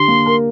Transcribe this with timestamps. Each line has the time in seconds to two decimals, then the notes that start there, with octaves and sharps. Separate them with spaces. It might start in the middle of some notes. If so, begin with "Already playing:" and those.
Already playing: D3 G4 C6
0.08 A#3
0.26 A#4